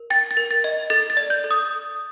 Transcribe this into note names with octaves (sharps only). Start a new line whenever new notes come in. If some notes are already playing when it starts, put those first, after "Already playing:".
Already playing: A#4
G5 A6
A6
A#4
A6
D#5
A4 A6
A6
D5
G6
A4
D#6